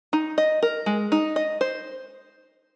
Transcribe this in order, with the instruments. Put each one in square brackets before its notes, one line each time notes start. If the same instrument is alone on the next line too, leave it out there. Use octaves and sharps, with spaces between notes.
[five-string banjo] D#4
D#5
A#4
G#3
D#4
D#5
C5